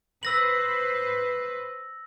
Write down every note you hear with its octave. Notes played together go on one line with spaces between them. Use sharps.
B4 C5 E6 A#6 F#7